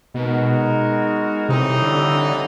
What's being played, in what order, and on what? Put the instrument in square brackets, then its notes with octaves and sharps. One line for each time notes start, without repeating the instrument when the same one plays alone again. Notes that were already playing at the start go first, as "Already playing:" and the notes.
[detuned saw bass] B2 [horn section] G#3 B3 D#4 F#4 A#4
[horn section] A2 E3 G3 C4 D#4 [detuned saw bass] C3
[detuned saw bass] D3